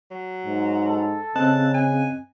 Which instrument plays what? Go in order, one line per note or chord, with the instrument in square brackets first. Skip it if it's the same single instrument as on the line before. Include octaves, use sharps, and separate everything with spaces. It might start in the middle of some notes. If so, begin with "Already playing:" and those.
[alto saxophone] F#3
[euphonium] G#2
[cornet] A4
[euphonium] C#3 [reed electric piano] C4 D#5 F#6 [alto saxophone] A5
[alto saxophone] G#5